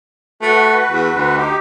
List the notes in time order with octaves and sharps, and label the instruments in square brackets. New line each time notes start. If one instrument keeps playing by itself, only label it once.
[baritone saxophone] A3 [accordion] F#4 B4
[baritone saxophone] E2
D2
[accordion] D#4 G4